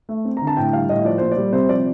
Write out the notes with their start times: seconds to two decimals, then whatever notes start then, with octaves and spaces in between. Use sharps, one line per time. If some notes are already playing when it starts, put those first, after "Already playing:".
0.09 A3
0.25 C4
0.37 D3 A#5
0.47 A5
0.57 A2 G5
0.73 G3 F5
0.89 A2 D#5
1.05 F3 D5
1.18 A#2 C5
1.31 D5
1.37 G3
1.53 C3 C5
1.69 F3 D5